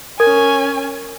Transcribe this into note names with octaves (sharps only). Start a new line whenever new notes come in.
C#4 A#4 G#5 G#6